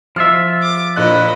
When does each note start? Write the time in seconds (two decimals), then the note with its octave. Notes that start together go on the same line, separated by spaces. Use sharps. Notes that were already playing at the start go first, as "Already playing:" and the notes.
0.16 F3 F4 E5 F6
0.62 D6
0.96 A#1 A#2 D#5 B5 F#6